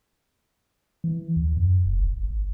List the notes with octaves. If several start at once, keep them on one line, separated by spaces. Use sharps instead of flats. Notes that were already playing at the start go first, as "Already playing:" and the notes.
E3
D#2
F#2
F1
A1
G#1